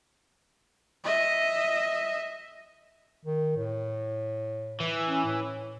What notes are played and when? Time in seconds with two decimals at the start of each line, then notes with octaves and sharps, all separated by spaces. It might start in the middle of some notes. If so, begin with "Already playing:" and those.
1.04 D#5 E5
3.26 D#3
3.57 A2
4.80 E3
5.09 C#4
5.26 A2